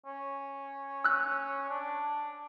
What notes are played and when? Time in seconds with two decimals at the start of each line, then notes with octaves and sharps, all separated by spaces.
0.06 C#4
1.04 E6 F#6
1.69 D4